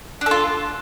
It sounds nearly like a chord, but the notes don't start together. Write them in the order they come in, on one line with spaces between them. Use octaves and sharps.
D4 A4 F4